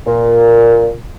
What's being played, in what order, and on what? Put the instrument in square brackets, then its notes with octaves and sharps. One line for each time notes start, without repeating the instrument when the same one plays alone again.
[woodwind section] A#2